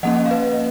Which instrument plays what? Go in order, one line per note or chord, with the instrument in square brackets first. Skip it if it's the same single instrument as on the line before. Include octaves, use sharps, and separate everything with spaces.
[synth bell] F3 A#3 C#4 D#5 F#5
F5
B4 D#5